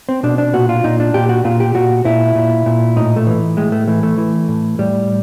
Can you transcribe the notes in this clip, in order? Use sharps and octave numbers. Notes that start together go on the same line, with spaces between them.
C4
B2 D4
D4
A#2 F#4
F4
A#2 D#4
D4
A#2 G4
F#4
A#2 F4
G4
A#2 F#4
A#2 E4
A#2
A#2
A2 D#4
A3
E3
A2 G#3
A3
E3 A3
A3
E3
A2
A2 G3